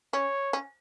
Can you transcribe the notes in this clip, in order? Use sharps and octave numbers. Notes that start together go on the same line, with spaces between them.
C#4 C#5
C#4